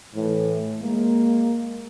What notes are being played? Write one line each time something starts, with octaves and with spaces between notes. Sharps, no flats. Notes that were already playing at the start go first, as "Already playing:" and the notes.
A2 E3
G#3 A#3